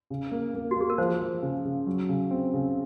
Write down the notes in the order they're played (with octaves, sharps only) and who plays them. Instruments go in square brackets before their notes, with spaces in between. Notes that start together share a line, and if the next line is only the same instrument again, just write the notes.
[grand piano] C#3
A#3
A#3
[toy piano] F#4
[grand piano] A#3 [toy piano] G#4
[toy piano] A#4
[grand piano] F3 [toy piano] C5
[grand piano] F3
C#3
C#3
F#3
C#3
C4
C#3